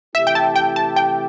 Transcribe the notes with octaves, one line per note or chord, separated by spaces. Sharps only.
C3 E3 A3 E4 G4 E5
G5
A5
G5
A5
G5